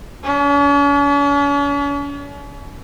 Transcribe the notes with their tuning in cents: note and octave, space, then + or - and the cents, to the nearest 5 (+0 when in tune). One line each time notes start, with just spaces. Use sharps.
C#4 +45